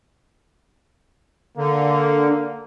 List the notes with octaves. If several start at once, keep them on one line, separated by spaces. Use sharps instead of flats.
D3 A#3